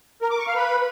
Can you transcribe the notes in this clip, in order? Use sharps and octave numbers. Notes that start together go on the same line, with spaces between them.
A#4
D6
C#6
F5
B4